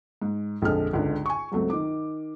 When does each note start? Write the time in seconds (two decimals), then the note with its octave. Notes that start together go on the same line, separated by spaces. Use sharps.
0.22 G#2
0.62 A#1 F2 D3 G#3 A4 F6
0.93 G#1 C#2 G#2 D3
1.26 G#5 C#6
1.52 C#2 F#3 A3 C4
1.70 D#3 D6